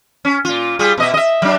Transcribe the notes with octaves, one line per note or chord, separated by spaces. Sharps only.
C#4
A#2 F4
G3 F4 G#4
B2 D#5 E5
D#5 E5
F#3 D4